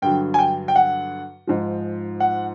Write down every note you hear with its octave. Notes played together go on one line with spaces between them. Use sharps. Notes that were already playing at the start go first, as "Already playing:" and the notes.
G2 D3 F#3 G5
G#5
G5
G5
F#5
G#2 F3
F#5